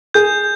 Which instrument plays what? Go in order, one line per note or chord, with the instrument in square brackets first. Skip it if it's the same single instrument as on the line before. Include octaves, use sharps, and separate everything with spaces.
[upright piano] G#4 [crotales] G6